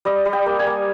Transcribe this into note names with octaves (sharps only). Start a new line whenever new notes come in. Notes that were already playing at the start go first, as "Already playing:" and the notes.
G3 D#5
G3
G5
A#3
G#5
A#3